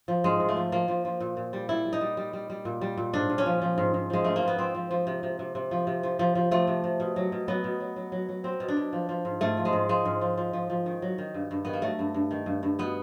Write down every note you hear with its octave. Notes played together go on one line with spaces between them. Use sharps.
F3
G#2 G#3
G#2
A3
F3
F3 A#3
F3
F3
A#2
A#2
G3
G3 E4
G3
D#4
G3
G3
G3
G3
A#2
G3
A#2
G#2 D4
G#2
C#4
F3
F3
G#2
G#2
F3 G#3
G#2 A3
A#3
F3
B3
F3 C4
F3
F3
C3
C3
C3
C3
F3
C3
F3
F3
F3
F3 A3
C3
C3
B2
F#3
B2
F#3 B3
B2
F#3
F#3
F#3
F#3
F#3 C4
B2
D4
B2
F3
F3
G#2
G#2 A3
F3
G#3
G#2
F3 G#3
G#2
F3
F3
F3
F3
D#3
F#3
D#3
G2
G2
D#3 B3
A#3
F#3 A3
G2
G2
D#3
G2
G2
B2 B3